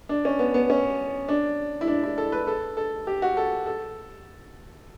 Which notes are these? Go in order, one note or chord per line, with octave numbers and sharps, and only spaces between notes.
D4
C#4
B3
B3
C#4
D4
E4
D4
E4
A4
B4
A4
A4
G4
F#4
A4
A4